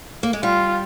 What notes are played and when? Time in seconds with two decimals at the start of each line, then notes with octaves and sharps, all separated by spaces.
0.23 A#3
0.33 G#3
0.43 G3 F4